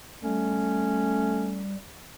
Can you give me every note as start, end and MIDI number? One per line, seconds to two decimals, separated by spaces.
0.24 1.76 55
0.24 1.67 57
0.24 1.70 61